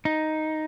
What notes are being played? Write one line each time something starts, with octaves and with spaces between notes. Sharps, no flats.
D#4